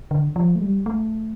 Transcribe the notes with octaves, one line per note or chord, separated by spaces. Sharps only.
D3
F3
A3
G3
A3